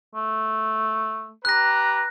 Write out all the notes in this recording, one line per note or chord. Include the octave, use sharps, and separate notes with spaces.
A3
G4 B4 A#5 F#6 A#6